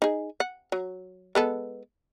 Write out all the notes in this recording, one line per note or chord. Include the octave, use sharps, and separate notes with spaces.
D#4 G#4
F#5
F#3
G#3 B3 A4